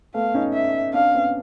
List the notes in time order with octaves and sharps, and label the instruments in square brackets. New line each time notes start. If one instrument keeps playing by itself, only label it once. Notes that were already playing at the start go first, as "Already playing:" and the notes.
[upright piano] A3 B3 [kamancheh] F5
[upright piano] C#4 D#4
[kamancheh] E5
[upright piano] C4 D4 [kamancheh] F5
[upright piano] B3 C#4